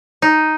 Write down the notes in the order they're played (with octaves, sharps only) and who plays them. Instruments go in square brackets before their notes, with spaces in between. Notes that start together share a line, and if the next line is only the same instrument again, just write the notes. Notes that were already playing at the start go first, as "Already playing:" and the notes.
[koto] D#4